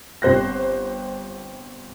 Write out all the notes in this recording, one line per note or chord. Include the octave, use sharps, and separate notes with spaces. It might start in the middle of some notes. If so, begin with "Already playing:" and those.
G1 C4 C5 F#6 A#6